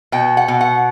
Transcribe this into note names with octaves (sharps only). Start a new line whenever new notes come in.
B2 G5
F#5
B2
F#5